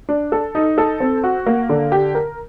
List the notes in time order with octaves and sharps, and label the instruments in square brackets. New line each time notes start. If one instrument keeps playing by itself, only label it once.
[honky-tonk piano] D4
A4
D#4
A4
C4
F#4
A#3
D3
G4
A#4